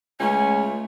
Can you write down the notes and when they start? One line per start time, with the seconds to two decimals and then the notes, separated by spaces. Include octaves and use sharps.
0.20 C#2 A3 C#4